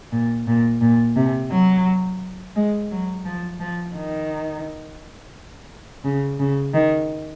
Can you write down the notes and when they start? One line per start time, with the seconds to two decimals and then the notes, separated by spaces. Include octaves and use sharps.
0.12 A#2
0.47 A#2
0.81 A#2
1.16 C3
1.51 F#3
2.56 G#3
2.91 F#3
3.25 F3
3.60 F3
3.95 D#3
6.04 C#3
6.39 C#3
6.74 D#3